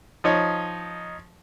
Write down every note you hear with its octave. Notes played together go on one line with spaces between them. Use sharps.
F3 D#4 C#5 D#6